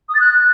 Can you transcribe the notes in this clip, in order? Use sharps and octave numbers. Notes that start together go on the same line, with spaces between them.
D#6
A6
F#6